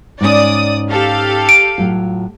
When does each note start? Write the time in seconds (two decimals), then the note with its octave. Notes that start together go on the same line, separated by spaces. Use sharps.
0.21 G#2 C#4 D5 D#6
0.90 G4 A4 F5
1.49 D7
1.78 A2 F#3 F4